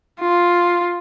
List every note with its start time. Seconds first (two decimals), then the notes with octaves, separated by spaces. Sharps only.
0.20 F4